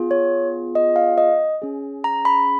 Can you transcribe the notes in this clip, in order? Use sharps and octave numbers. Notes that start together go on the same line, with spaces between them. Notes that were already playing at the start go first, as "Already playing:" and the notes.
Already playing: B3 F4 G#4
C#5
D#5
F5
D#5
C#4 G#4
A#5
B5